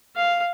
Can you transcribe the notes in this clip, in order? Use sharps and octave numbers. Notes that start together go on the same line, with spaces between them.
F5